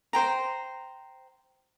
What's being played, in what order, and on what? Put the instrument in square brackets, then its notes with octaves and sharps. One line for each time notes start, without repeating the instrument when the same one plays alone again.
[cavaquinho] C5 G5 A#5